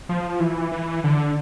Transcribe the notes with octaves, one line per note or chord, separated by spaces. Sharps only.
F3
E3
E3
D3